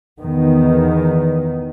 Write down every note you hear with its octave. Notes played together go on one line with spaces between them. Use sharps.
E2 D#3 B3